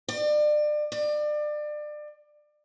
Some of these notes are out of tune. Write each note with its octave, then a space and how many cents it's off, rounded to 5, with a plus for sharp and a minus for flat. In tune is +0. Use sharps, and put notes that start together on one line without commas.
D5 +30
D5 +30